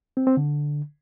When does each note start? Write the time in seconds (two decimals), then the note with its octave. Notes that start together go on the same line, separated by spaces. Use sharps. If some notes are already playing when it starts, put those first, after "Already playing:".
0.17 C4
0.27 C4
0.37 D3